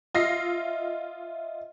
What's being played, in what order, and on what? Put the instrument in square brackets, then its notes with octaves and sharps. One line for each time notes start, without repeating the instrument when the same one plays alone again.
[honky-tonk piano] F4 A#6 C7 [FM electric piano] D#5 E5